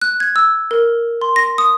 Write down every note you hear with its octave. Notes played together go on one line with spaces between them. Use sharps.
F#6
G#6
E6
A#4
C6
A#6
D#6